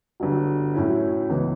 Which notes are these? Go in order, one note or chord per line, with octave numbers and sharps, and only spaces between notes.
G1 G2 F#3
A2 F#3 C#4 E4
C#2 C#3 E3 B3